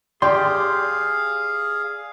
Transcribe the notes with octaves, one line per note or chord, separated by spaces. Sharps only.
G4 G#4 D5 F5 C6